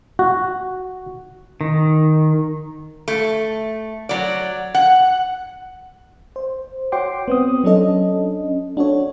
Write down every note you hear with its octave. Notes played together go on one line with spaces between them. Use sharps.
F#4
D#3
A3
F#3 D5
F#5
C5
F#4 C#5 F#5 G5 C6 D6
B3 C4 D#6
F#3 C#4 D4 A4 D#5
D4 F#4 A4 C#5